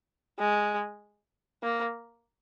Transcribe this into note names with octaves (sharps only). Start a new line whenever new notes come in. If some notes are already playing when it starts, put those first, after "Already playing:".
G#3
A#3